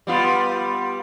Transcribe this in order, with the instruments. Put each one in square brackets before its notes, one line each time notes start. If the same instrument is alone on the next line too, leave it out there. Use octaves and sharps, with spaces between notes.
[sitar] G3 B3 F4